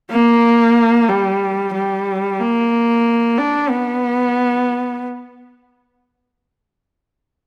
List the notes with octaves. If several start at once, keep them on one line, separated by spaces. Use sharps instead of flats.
A#3
G3
G3
A#3
D4
B3